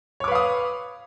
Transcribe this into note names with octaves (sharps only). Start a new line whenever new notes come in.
B4 C#5 F5 D6 D#6